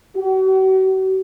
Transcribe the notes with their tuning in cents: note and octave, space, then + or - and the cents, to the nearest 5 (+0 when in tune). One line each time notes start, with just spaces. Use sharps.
F#4 +45